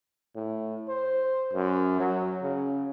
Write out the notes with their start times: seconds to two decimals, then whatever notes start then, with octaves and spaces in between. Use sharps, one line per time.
0.35 A2
0.88 C5
1.53 F#2
2.00 F#3
2.43 C#3